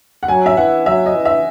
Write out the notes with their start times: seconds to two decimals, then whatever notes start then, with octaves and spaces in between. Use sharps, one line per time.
0.23 F#5
0.28 F#3 G#5
0.46 E5
0.57 E3 F#5
0.86 F#3 E5
1.06 D#5
1.15 E3
1.25 E5